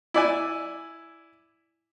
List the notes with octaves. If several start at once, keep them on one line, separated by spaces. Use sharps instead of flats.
E4 D5 G#5